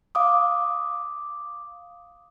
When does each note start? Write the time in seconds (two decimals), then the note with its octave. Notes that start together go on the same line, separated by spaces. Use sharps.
0.15 F5 D6 D#6